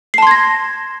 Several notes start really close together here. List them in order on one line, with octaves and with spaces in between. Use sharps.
C7 A5 C6 G#6 A#6